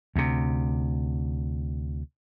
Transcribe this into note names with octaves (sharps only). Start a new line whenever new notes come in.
D2 C3